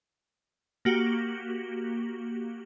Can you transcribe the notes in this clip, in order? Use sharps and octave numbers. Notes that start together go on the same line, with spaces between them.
A#3 F#4 G4